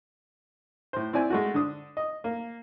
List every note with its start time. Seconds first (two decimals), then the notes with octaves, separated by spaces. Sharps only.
0.93 A2 C5
1.13 C4 E4 D5 G#5
1.30 G#3 A3 F#4
1.54 D3 D4 D#6
1.97 D#5
2.24 A#3